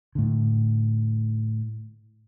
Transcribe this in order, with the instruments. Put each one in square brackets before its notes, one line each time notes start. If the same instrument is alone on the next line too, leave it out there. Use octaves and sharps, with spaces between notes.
[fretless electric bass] A2 D3